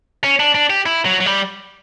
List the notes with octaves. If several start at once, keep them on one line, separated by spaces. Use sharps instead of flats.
C#4
D4
D4
G4
E4
F#3
F#3
G3